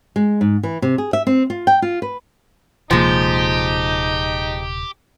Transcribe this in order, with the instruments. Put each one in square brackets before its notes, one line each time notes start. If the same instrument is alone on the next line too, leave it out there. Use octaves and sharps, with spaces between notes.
[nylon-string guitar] G#3
G#2
E3
C3
G#4
E5
C4
F4
G5
F4
B4
[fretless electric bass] D#1 C3 A#3 [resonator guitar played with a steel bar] F3 G#3 [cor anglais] D#4 [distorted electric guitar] G4